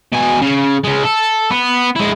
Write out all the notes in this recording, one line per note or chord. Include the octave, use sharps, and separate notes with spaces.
B2 G#5
C#3
C#3 G#3
A4
B3
G#3 E4